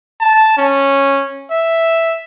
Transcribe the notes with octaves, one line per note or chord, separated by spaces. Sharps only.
A5
C#4
E5